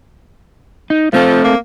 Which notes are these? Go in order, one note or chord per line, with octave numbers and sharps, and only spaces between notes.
D#4
F3 A3 C4 A4
A#3